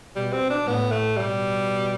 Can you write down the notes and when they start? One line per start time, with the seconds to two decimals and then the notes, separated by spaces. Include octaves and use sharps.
0.16 B2 G3
0.33 C4
0.50 D4
0.66 A2 B3
0.92 A3
1.17 B2 G3